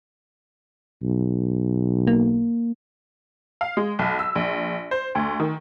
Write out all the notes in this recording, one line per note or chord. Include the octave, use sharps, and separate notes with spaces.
B1
A#3
F5
G#3
B1
E6
A#1
C5
D2
D#3